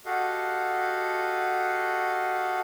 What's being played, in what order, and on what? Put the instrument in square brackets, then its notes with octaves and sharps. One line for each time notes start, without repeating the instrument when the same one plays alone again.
[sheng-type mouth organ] F#4 G4 A4 D#5 F5 F#5